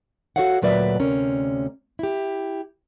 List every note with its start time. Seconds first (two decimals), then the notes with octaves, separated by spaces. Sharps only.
0.36 F#4 G#4 A4 C#5 F5 F#5
0.62 D2 A#2 F#3 B4 D5 E5
0.99 D2 C3 C#4 A#4
1.99 E4 G4